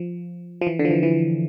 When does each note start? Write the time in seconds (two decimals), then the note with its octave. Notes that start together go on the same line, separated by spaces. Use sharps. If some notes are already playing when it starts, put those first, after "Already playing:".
Already playing: F3
0.61 F3
0.67 E3
0.79 D3
0.85 F3
0.91 E3
1.03 E3